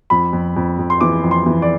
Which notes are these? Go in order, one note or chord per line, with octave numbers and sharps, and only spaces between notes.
F2 B5
F2
F2
F2
C6
E3 D6
F2
C6
E3
D5